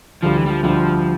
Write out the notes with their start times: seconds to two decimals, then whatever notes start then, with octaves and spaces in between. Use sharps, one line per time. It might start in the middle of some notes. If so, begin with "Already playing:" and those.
0.22 D2 D3 F3 G3
0.37 E3
0.46 G3
0.50 F3
0.63 D2 D3 F3 G3